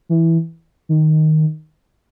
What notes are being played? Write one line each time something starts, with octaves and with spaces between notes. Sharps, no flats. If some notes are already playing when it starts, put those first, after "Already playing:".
E3
D#3